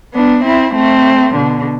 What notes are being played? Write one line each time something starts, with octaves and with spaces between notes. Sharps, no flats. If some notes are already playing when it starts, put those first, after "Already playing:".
B3 D4
C4 E4
A3 C4
B2 D3